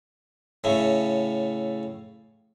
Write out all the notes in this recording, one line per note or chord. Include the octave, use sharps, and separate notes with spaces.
A2 C#3 A3